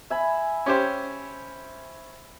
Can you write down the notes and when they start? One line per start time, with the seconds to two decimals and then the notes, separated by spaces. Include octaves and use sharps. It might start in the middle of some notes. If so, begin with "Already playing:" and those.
0.10 E5 G#5 B5
0.66 C#4 G4 C5